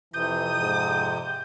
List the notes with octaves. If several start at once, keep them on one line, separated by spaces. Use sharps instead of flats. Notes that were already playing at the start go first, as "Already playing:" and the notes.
F2 C3 E3 D#6 G6
G#2